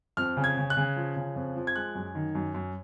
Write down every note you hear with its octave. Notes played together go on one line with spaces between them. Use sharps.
F2 F6
C#3
G#6
C#3
F#6
C#3
F3
C#3
F2
F3
G#6
G#3 F#6
F#2
D#3
F#2
F#2